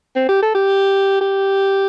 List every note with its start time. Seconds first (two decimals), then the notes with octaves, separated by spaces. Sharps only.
0.16 C4
0.29 G4
0.42 A4
0.55 G4
1.21 G4